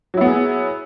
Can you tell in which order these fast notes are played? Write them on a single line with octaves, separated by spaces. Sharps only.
F#3 E4 B3 G#4